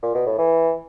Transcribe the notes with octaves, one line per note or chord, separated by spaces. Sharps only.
A#2
B2
A2
E3